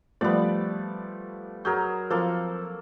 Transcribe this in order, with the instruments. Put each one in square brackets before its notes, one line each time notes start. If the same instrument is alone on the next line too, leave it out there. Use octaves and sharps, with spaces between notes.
[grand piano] F3 G3 A3 [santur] B3 D5
[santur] F#3 G#4 A#4 [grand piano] G6
[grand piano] F3 C4 [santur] A#3 A4